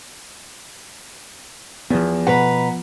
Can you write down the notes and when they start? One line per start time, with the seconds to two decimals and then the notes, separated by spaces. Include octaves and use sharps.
1.90 E2 F3 B3
2.27 B2 B4 F#5 A#5